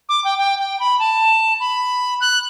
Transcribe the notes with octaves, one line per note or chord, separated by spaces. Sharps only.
D6
G5
G5
G5
B5
A5
B5
F#6